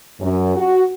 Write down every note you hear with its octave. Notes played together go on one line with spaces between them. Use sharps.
F#2
F#4